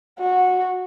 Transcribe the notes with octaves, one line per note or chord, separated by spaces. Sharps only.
F#4